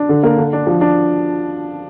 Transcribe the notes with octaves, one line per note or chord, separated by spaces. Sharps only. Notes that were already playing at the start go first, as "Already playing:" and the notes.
Already playing: D4
D3
A#3
D3
D4
F3
D4